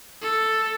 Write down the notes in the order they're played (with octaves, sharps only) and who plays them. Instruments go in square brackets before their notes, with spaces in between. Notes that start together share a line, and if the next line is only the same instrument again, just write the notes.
[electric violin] A4